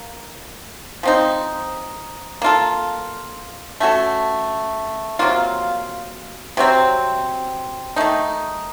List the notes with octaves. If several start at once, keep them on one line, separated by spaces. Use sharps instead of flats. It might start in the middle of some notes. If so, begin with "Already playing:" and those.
Already playing: A#3
F3 C4 D#4
A#3 F4 A4
A3 C#4 F#4 A4
C3 F#3 A#3 F4
C3 F#3 C4
D#3 A3 D#4